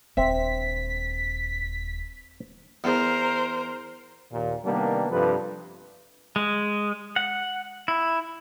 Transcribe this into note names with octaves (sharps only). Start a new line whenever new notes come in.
D#1 C4 D4 C5 E5 B6
E2 A#4 C5
D#2 A#2
C3 D#3 G3 A#3 B3 D4
G2 C3 F3 A4 B4
G#3
F#5
E4